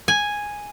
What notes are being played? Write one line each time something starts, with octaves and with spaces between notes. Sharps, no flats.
G#5